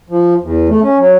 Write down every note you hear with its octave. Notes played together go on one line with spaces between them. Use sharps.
F3
E2
A3
C#4
F#3